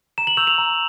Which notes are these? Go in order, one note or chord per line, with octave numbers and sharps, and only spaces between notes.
A#5 E7
F#7
C#6 E6 G6 F7
F7
A#5